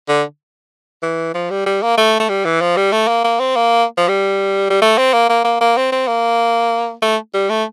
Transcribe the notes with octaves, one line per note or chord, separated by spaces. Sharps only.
D3
E3
F3
G3
G3
A#3
A3
A3
G3
E3
F3
G3
A3
A#3
A#3
C4
A#3
F3
G3
G3
A3
C4
A#3
A#3
A#3
A#3
C4
C4
A#3
A3
G3
A3